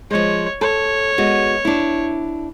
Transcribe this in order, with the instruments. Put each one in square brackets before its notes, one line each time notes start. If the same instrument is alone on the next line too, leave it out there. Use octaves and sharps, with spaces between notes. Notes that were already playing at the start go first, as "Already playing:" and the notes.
[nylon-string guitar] F3 G#3 [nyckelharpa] C#5
[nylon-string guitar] A4 [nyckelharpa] C#5
[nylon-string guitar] G#3 B3 F#4
D4 E4